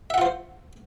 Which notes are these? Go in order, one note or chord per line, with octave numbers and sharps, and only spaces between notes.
F4 C5 E5 F#5